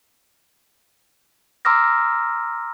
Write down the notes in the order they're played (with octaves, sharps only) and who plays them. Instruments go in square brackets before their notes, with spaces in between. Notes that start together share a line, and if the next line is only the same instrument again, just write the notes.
[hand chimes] A#5 C6 D6 E6 F6 A#6